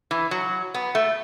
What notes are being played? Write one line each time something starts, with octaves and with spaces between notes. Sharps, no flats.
E3
F#3
B3
A3